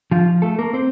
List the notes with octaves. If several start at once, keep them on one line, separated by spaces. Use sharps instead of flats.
F3 F4
A3 A4
A#3 A#4
C4 C5